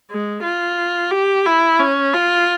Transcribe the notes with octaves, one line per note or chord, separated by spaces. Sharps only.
G#3
F4
G4
E4
C#4
F4